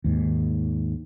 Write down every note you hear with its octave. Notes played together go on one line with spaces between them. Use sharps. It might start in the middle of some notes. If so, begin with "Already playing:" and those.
D#2 G#2